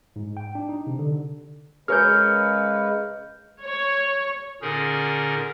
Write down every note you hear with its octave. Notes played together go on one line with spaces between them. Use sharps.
G#2
G5
D4
D#4
C3
D3
C#3 G#3 G#4 A#4 B4 C#5 F6 G6
C#5
A#2 D3 C#4 D#4 G#4 A#4